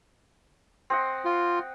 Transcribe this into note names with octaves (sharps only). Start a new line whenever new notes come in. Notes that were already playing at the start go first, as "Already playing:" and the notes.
C4 D#5 F#5
F4